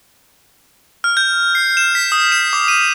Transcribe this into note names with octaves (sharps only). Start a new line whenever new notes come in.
F6
G6
C7
E7
B6
D#6
E7
D6
D#7